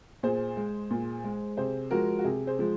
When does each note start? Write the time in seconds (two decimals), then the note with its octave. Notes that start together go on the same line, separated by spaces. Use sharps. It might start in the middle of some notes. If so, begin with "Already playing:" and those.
0.23 A#2 G#4 C5
0.57 G#3
0.90 A#2
1.24 G#3
1.57 C3 G#4 C5
1.91 F3 G#3 F#4 A#4
2.19 F#4
2.24 C3 G#4
2.47 G#4 C5
2.59 F3 G#3